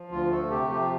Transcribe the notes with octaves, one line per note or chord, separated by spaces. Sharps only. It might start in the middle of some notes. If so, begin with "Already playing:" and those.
Already playing: F3
D2 F4
A3 A4
C3 G4
F3 G4